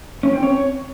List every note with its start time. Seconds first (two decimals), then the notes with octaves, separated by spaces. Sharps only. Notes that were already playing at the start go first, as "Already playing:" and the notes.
0.23 C#4
0.33 C4
0.43 C#5